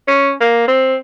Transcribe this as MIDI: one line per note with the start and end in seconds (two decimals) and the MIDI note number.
0.08 0.32 61
0.41 0.67 58
0.68 0.96 60